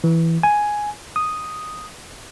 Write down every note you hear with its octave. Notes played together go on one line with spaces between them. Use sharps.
E3
G#5
D#6